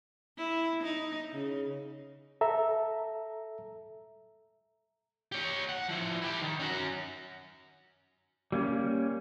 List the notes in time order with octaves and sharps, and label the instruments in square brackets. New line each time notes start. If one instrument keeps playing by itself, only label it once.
[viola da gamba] E4
D#4
C#3
[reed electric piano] A4 E5 A#5
[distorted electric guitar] G4 C#5
F#5
F3 E4
E4 G4
D#3
C#4 F#4
[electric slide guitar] G3 A#3 C#4